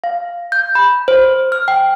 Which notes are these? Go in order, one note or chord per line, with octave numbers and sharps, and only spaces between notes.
F5
G6
B5
C5
F6
G5